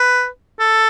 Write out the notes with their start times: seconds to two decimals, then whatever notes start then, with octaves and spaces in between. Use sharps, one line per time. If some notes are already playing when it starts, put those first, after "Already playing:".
Already playing: B4
0.60 A4